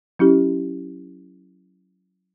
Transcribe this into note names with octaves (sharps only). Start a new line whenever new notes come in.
F#3 C#4 E4 G4